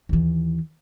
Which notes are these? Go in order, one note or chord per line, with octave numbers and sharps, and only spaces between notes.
D#2 E3